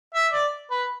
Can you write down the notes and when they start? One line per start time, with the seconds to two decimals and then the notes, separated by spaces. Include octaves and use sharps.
0.14 E5
0.33 D5
0.71 B4